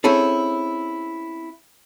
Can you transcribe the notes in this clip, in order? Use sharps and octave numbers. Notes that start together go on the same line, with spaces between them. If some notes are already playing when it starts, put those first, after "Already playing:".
C4 C#4 E4 G#4 A4